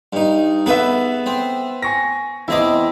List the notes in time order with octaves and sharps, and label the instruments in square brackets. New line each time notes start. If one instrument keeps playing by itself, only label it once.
[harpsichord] G2 D#4
[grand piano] B3 E5 [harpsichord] G#4 A4 B4
[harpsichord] C4
[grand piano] G#5 C#6 A#6
[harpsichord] E2 C4 D6 [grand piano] E4 D#5